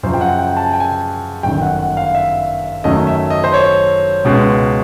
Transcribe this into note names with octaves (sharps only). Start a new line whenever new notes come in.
F#2 C#3 F3 C5
G5
F#5
G5
A5
G#5
G5
G#5
G1 F#2 D#3 G5
F#5
F#5
F5
E5
F#2 D#3 F#3 A3 C#4 D#5
E5
D#5
C5
C#5
C#2 B2 G#3 C#4